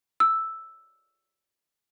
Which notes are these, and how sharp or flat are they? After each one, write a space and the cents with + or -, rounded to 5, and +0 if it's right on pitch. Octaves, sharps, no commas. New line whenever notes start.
E6 +0